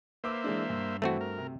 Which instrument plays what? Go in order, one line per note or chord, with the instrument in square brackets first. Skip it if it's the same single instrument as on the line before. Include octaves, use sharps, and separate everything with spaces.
[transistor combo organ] A#3 C5 E5 [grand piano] B4 D6 E6
[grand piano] E3 G#3 D4
G2
[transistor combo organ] E3 [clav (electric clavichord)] A3 C4 F#4
[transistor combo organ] A#4
[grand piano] C3